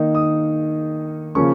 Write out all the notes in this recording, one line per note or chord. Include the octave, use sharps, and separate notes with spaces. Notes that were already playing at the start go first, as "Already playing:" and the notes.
Already playing: D#3 A#3 D#4
D#6
C#3 F3 A#3 C#4 C#6